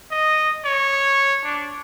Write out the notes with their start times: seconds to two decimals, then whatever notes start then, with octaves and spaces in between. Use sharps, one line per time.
0.11 D#5
0.65 C#5
1.45 D4